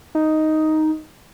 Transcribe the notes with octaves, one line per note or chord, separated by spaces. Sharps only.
D#4